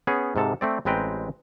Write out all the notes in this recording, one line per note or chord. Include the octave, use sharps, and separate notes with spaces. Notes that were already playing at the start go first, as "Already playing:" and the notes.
B3 C#4 G#4
G#2 C3 A4 A5
A3 C4 D5
A1 G#3 C4 B4 G5 A#5